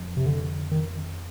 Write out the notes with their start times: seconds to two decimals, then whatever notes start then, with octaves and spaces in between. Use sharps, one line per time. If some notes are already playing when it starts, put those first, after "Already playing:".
Already playing: F2
0.17 C3
0.26 D3
0.71 D#3